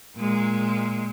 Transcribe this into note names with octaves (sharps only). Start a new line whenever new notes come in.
A#2 G#3